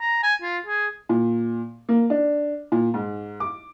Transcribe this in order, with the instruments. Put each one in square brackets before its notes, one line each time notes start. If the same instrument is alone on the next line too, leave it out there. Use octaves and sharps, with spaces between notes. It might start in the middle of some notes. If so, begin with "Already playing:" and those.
[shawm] A#5
G#5
F4
G#4
[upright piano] A#2
A#3
D4
A#2
G#2
D6